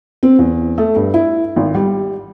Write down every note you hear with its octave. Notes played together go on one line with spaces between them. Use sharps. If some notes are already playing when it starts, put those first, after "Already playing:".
C4
E2
A3
G2
E4
G#1
G3